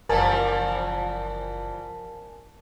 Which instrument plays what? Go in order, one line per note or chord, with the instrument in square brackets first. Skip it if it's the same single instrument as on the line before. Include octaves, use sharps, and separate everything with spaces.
[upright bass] F#1 [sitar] E3 F3 G3 [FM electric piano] A#4 G#5 A5